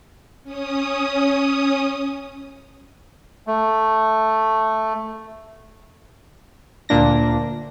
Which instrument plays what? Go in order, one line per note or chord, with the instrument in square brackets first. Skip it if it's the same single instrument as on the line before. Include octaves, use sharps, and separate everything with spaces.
[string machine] C#4 D#6
[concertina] A3
[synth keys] D2 A#2 A#3 D4 A#6